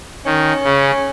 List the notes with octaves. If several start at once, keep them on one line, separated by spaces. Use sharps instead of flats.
D#3 C#4
C#3